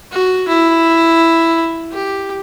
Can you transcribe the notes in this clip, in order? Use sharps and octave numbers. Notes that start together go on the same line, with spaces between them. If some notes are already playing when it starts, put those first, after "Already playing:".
F#4
E4
G4